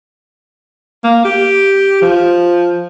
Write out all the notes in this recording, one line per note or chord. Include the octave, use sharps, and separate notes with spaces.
A#3
G4
F3